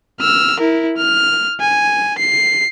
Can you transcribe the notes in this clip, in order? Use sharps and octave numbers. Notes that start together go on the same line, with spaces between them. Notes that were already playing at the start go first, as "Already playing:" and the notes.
E6 F6
E4 A#4
F6
G#5
C7